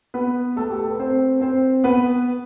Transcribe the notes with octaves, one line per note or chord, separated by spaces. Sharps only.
B3 B4
A3 A4
G4
A4
B4
C4 C5
C4 C5
B3 B4